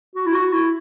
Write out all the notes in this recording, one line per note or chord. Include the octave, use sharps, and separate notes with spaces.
F#4
E4
F#4
E4